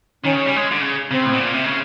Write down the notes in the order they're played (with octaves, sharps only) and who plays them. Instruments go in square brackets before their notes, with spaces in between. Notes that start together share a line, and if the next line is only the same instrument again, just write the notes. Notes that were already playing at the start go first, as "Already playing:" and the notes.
[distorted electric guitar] D#3 [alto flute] C#4
[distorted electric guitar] C#3
G3
G#3
D3
C#3
[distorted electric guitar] C#3 [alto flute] C4
[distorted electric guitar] A2
B2
A#2
C3
C#3